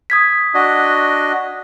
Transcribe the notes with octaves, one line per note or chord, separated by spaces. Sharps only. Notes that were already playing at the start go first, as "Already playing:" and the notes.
D#6 G#6 B6
D4 F#4 D#5